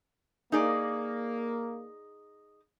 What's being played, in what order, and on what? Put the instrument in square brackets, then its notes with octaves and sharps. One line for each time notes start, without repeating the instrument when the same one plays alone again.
[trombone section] A#3 [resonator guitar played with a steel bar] D#4 G#4 D5